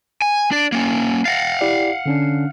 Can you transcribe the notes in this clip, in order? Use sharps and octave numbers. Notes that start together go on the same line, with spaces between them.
G#5
D4 D5
A#3 C#4
F5 F#5 A6 A#6
E4 G4 D5
D3 C#4 D4